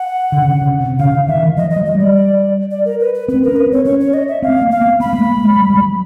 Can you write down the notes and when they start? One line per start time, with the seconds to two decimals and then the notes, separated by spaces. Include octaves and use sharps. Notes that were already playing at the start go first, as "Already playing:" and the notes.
Already playing: F#5
0.32 D3
0.42 C#3
0.61 C#3
0.80 C3
0.99 C#3 F5
1.14 C#3
1.28 D#3 E5
1.43 E3
1.57 F3 D#5
1.70 D#5
1.76 F#3
1.85 D#5
1.95 G3 D5
2.71 D5
2.85 A#4
3.00 B4
3.15 B4
3.28 C4 B4
3.43 C#4 A#4
3.56 B4
3.66 C4
3.72 C#5
3.85 C#4 C#5
4.00 C#5
4.14 D#5
4.28 E5
4.42 C4 F5
4.62 A#3
4.71 F5
4.81 B3
5.00 B3 B5
5.13 A3
5.18 A#3
5.38 G#3
5.56 G3
5.70 G3
5.76 F#3